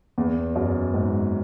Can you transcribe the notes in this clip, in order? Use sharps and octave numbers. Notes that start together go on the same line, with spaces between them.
E2
F#2
G#2